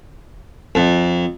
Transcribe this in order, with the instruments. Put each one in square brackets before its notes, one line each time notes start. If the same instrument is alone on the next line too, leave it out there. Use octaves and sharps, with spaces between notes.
[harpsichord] F2